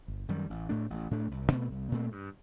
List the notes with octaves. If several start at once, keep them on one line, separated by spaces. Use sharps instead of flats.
G1
F#2 D#3 G3
A1
A2 A3 D4
A1
A2 A3 D4
C2
A#2 A3 C4
C2
A#2 A3 C4
G2